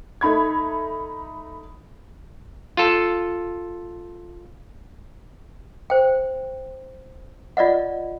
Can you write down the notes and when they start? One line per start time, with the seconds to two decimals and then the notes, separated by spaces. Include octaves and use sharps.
0.21 A3 D#4 B5 G#6
2.77 F4 A4
5.90 C5 G5
7.57 F4 D5 D#5 F#5